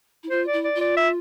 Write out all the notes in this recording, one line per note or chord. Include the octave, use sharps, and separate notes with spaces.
E4
F4 C5
D5
E4
D5
F4
D5
E5